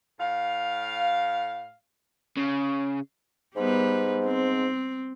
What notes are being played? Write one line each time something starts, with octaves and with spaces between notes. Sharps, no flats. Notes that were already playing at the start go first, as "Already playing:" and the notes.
A2 F5
C#3
G#2 G3 B3 B4
C4